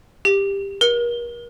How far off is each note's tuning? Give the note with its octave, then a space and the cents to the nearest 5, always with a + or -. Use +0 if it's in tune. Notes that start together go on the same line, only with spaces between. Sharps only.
G4 +15
A#4 +40